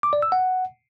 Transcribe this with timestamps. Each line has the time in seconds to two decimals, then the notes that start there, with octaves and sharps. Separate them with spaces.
0.03 D6
0.13 D5
0.22 E6
0.32 F#5